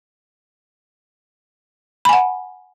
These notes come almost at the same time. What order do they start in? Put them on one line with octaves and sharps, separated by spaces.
B5 G#5 F#5